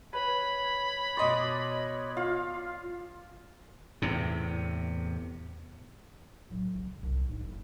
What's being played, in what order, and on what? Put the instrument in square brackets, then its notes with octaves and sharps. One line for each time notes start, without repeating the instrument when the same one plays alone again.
[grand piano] B4 [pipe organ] C#5 [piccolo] B5
[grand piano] B2 D#5 C6 [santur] D5 D6
[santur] F4 F5
[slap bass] E2 A2 C3
[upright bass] A2 F#3
C#3
C2 G#2
G#2 D4
F#1